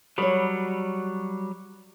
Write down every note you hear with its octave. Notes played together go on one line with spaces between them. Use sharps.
F#3 G3 B4 C#5